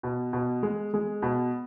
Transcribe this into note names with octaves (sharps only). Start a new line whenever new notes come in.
B2
B2
G#3
G#3
B2